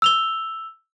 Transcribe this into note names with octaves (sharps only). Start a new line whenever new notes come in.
E6 F7 G7